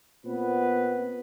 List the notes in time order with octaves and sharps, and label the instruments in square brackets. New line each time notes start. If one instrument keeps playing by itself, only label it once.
[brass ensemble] A#2 B3 C4 B4